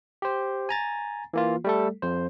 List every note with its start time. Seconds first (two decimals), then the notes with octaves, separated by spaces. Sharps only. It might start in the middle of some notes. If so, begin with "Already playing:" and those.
0.22 G4 C5
0.69 G#5 A#5 A6
1.33 E3 A#3 F4
1.64 G3 A3 A4
2.02 F2 C5